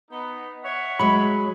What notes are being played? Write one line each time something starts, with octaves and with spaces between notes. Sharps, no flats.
B3 D#4
C#5 E5 F#5
F#3 G#3 B5